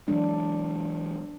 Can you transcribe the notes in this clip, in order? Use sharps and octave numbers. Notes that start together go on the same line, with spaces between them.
E3 F#3 G#3 D4